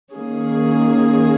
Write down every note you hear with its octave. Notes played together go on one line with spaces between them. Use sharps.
D#3 A#3 C#4 G#4